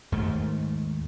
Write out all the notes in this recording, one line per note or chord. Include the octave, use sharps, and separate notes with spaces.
D#2 G#2 A3